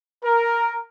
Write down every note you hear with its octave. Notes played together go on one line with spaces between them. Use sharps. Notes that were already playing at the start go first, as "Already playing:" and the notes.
A#4